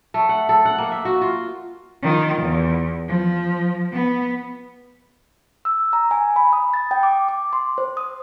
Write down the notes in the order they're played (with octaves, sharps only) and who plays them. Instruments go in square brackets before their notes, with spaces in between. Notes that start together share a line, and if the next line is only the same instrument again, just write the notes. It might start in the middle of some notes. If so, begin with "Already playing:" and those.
[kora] A3
F#5
A4
F#5
A#3
E5
F#4
F4
[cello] D#3 F4
E2
F3
B3
[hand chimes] E6
A#5
G#5
B5
D#6
A6
G5
D6
D6
C6
C5
D#6